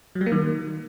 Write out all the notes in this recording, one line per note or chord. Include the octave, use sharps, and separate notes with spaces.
F#3
G3
A#3
D#3